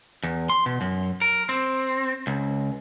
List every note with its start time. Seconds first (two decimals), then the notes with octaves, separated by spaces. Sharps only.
0.23 E2
0.50 C6
0.66 B2
0.81 F#2
1.21 A#4
1.49 C4
2.27 C#2